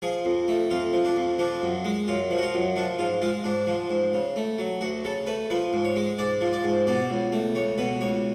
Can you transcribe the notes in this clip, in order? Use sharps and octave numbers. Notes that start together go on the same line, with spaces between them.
F3 G#4
F2
A3
F2 F4
F3
D4
F2
F3 D4
F#2
G#3
F#2 F4
F3
F#4
F4
F#2
F3 D4
G#2 F4
G#3 F4
G#2 D4
F3
G#2
C#3
A3
F#3
D2 F#4
C#3 A4
A3 B4
F3 B4
G#2
C#5
G#3
G#2 D5
F3
D5
G#2
B2 D5
C#2
A3
C#2 C#5
B2 B4
C#2 C#5